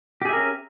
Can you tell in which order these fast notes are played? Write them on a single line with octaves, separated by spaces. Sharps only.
G4 G#4 E5 A#4 C#4